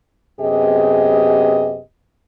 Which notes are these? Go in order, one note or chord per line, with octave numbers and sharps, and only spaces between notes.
F#2 C3 B3 G4 G#4 D#5